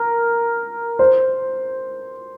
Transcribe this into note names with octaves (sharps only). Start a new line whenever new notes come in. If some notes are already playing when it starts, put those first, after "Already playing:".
Already playing: A#4
C5